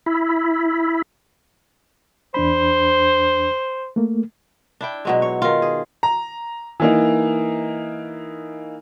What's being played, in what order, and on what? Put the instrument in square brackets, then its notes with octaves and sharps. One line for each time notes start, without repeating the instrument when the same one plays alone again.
[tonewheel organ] E4
[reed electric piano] E2 D4 B5 [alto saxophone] C5
[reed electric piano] A3 A#3
[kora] D4 E4 G5
B2 F#3 G#3
C#5
D#3 F4
G#4
[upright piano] A#5
E3 A#3 D#4